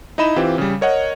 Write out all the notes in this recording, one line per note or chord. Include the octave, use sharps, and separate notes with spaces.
D#4 E4 D#5 B5 E7
E3 C4 F4 G4
C#3 G3
A#4 C#5 D#5 F#5